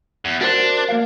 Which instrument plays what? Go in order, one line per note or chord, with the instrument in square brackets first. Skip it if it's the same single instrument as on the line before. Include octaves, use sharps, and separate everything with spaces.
[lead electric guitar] E2
[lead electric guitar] D4 [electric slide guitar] F#4 A#4 C5
[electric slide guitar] A#3 A#4 F5